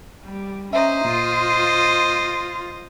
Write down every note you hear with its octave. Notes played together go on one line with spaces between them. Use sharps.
G3
C#4 C5 D#5 E5 A#5
A#2 F4